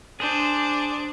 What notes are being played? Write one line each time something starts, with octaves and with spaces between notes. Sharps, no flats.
D4 G#4 C5